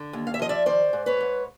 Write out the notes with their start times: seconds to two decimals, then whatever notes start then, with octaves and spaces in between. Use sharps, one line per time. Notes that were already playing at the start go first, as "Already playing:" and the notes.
Already playing: D3
0.13 D#2
0.27 F5
0.34 E5
0.39 F3 D#5
0.49 D5 E5
0.66 D#3 C5 D5
0.93 G#2
1.06 B4 C#5
1.21 G#2